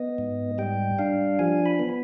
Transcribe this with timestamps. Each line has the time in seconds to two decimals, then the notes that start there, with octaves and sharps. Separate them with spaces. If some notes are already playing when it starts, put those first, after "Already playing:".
Already playing: B3 D#5
0.18 G#2
0.58 G3 G5
0.99 D4 F5
1.39 F3 G#5
1.66 B5
1.79 B3